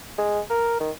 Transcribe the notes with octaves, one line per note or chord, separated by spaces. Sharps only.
G#3
A#4
D#3